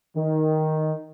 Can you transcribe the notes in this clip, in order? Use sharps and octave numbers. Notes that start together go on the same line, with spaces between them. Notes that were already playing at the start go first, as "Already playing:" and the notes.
D#3